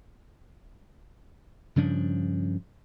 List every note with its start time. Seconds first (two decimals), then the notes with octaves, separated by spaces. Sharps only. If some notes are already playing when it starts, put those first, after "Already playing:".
1.76 G2 C#3 F3 D4